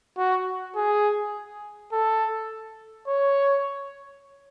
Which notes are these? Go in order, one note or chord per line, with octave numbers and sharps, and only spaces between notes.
F#4
G#4
A4
C#5